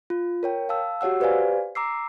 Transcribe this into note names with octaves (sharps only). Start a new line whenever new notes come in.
F4
A#4 C#5 G5
F5 A5 E6
F#4 G4 C#5 F#5 E6
G4 B4 C5 D5 F5 G#5
A#5 D6 E6 C7